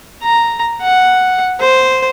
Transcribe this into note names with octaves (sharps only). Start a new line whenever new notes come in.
A#5
F#5
C5